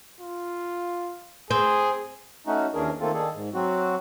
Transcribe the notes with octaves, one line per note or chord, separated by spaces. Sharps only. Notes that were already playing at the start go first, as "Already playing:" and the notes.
F4
C4 G#4
A3 C#4 D#4 F#4
D#2 E3 C#4 D4 G#4 A#4
D#3 A3 A#3 C4 F4 A4
D#3 D4 G#4 A4
G#2
F#3 C4 F#4